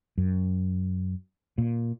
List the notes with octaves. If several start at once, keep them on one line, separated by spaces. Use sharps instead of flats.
F#2
A#2